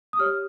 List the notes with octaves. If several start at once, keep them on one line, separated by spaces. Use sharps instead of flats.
D#6
G4 C#5 F6